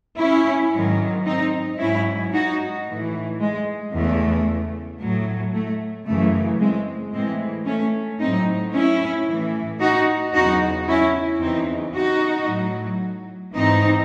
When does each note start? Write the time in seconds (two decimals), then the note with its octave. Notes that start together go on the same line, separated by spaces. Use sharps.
0.19 C#4 E4
0.73 G#2 D#3 F#3
1.26 C4 D#4
1.79 G#2 F#3 C#4 E4
2.33 D#4 F#4
2.86 A2 E3
3.40 G#3
3.93 E2 C#3 E3 A3
5.01 A2 F#3
5.53 A3
6.07 F#2 C#3 E3 A3
6.60 G#3 C4
7.13 A2 E3 G#3 C4
7.67 A3 C#4
8.20 A2 F#3 C4 D#4
8.73 C#4 E4
9.27 A2 E3
9.81 D#4 F#4
10.34 E2 C#3 F#3 D#4 F#4
10.88 C#4 E4
11.41 E2 C#3 E3 C4 D#4
11.95 D#4 F#4
12.47 A2 F#3
13.54 G#2 E3 C4 D#4